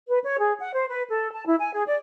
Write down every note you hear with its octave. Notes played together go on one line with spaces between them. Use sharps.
B4
C#5
G#4
F#5
C5
B4
A4
A5
E4
G#5
G#4
D5